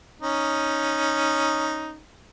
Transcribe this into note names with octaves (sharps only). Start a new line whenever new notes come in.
C#4 D#4